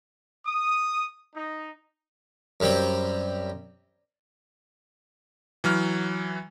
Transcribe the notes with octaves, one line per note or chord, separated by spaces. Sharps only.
D#6
D#4
F#2 G3 C4
E3 F#3 F6